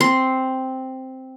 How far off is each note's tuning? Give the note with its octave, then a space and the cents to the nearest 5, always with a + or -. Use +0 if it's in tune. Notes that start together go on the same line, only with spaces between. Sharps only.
C4 +0 C6 +0